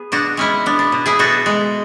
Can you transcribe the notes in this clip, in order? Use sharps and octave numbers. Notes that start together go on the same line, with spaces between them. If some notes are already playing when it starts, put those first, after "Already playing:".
Already playing: B3 G#4
B2 D4 F#4
G#3 C#4 E4
B3 D4
D4
B2
E4 G#4
B2 F#4 A4
G#3